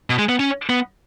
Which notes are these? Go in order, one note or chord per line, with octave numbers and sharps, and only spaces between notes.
B2
G#3
B3
C#4
B3